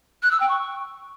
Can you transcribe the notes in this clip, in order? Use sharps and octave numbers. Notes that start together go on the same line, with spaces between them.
F#6
E6
G5
C#6